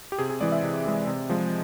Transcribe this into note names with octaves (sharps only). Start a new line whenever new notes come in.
G4
C3 G#4
G#4
E3 G#3 D5
E5
C3
E3 G#3
C3
F3 G#3